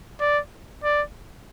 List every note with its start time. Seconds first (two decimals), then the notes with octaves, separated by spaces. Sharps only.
0.20 D5
0.84 D5